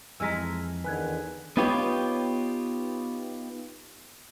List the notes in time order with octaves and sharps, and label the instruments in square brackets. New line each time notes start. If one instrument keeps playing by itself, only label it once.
[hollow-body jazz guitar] F2 D#5 A#5 [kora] E3 G#3 [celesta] E6 F6 B6
[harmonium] E2 D3 D#3 [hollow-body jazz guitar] B4 [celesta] G#5 F#6 G#6
[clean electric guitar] B3 D#4 F4 G4 B4 C#5